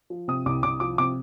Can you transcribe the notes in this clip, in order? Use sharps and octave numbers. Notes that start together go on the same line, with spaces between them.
F3
C3 D#6
C2 D6
C2 D6
F3 D6
C3 D6